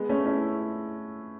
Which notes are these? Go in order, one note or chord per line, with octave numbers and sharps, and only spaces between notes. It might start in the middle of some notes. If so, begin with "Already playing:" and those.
Already playing: G#3 B3
A3 C#4
C#4 E4